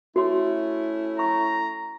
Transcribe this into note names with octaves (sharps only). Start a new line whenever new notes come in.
A3 C#4 E4 F#4 C6
A#5 C#6